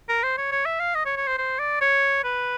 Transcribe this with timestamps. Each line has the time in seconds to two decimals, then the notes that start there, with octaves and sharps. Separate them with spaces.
0.09 A#4
0.23 C5
0.38 C#5
0.52 C#5
0.66 E5
0.80 F5
0.95 D#5
1.06 C#5
1.17 C#5
1.27 C5
1.38 C5
1.59 D5
1.81 C#5
2.24 B4